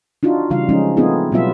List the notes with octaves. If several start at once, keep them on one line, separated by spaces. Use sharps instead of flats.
D4 D#4 F4 F#4
C#3 E3 G3 F4 F5
F3 G#3 C#4 D#4
A3 B3 C4 D#4 F4 G#4
B2 F#3 G3 B3 F4 E5